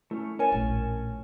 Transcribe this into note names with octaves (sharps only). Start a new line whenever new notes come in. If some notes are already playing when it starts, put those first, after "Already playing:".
A3 C#4 E4
C#4 A#4 C#5 G#5 A5
A#1 A2